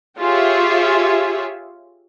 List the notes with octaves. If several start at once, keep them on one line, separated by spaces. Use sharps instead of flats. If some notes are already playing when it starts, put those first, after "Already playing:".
F4 G4 G#4 C#5 E5